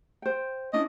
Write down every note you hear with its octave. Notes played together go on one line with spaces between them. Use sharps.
C5 G5
C#4 D4 E4 D#5